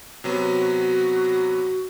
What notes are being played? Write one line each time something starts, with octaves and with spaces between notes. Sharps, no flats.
C3 F#3 B3 F#4